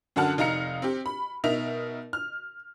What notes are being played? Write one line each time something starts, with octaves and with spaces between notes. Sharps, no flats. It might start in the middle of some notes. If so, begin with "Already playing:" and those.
F#2 D3 F#4 F#5 A5 F6
F1 D#4 F5 A#5 F6 C#7
C4 G4
B5
B2 D#4 A#4 E5 F7
F6